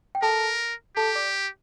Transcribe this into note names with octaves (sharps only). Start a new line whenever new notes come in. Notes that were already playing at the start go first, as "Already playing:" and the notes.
G5
A4 A#4 A5
G4 A4 A5
D5 D6